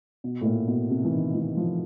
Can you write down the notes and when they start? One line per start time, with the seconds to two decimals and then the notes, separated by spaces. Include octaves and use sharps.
0.24 B2
0.41 A2
0.45 A#2
0.68 B2
0.90 C3
1.05 E3
1.12 D#3
1.35 E3
1.57 F3